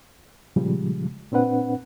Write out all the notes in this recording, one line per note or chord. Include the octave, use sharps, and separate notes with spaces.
A#2 C#3 F3 G3 G#3
A#2 C4 D4 B4 F#5